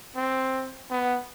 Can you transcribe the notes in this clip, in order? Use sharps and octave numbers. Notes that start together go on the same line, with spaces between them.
C4
B3